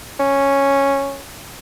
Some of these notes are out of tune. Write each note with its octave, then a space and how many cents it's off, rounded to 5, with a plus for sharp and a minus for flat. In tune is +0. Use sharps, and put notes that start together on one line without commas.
C#4 -5